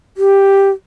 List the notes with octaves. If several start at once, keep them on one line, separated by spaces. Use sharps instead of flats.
G4